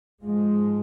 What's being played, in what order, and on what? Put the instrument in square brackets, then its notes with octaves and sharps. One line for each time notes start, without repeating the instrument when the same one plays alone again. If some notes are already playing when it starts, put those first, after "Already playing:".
[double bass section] G#2 F3 G#3